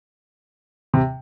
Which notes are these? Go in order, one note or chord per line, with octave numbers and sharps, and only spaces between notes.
C3